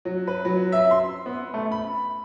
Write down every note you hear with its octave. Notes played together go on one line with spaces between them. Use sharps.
F#3
B4
F#3
E5
C6
B3
A3
B5